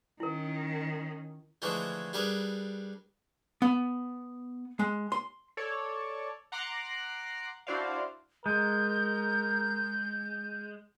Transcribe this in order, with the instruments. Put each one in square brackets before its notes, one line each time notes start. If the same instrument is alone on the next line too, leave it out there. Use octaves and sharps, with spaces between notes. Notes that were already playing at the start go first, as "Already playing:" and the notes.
[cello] D#3 C#4 [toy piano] E4 A#4
[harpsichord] D3 E3 F3 G#3 A3 G#4
G3 D4 G#4 A#4 B4
[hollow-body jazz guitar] B3
G#3
C6
[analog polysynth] A4 C#5 D5
F#5 A#5 C6 D6 F#6
D4 E4 F#4 C5 D5 F5
[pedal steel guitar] G#3 [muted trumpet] A#4 [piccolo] G6